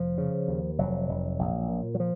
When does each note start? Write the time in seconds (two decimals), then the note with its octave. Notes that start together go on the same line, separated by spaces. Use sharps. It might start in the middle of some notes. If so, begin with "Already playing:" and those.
Already playing: F1 F3
0.18 C#3
0.48 D#2
0.78 F1 F#3
1.09 F1
1.39 A#1
1.69 A#2
1.94 F#3
2.00 F3